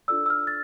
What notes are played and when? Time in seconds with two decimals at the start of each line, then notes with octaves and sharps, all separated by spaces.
0.08 D4 F4 A4 D5 E6
0.26 E6
0.30 F6
0.47 A6